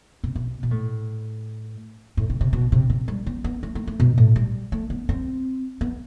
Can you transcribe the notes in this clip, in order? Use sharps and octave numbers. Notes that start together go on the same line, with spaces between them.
C3
B2
B2
A2
A2
C3
C3
B2
C3
C3
G3
B3
B3
A3
A3
A3
B2
A2
G3
A3
B3
C4
B3